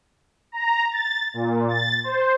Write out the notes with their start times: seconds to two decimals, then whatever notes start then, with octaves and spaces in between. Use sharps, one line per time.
0.52 A#5
0.91 A6
1.34 A#2
1.68 A6
2.04 C5